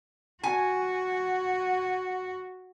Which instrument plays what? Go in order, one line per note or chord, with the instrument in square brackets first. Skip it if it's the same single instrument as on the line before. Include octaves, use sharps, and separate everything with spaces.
[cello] F#4 [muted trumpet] F#5 [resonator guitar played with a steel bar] G#5